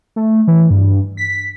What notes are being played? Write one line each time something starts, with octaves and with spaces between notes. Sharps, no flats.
A3
E3
G2
B6